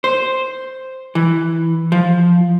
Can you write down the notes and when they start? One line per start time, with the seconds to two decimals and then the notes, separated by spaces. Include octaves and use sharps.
0.04 C5
1.15 E3
1.92 F3